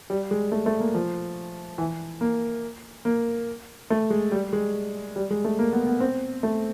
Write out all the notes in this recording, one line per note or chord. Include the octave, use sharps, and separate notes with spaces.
G3
G#3
A3
A3
A#3
F3
E3
A#3
A#3
A3
G#3
G3
G#3
G3
G#3
A3
A#3
B3
B3
C4
A3